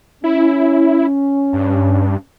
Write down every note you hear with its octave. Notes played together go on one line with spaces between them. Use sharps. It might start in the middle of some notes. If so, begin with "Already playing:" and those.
C#4 E4
G2